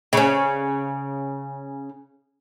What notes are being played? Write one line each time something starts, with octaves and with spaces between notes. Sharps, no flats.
C#3 C#4